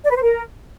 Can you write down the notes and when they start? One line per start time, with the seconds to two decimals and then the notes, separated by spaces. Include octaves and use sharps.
0.04 D5
0.10 B4
0.16 C5
0.23 A#4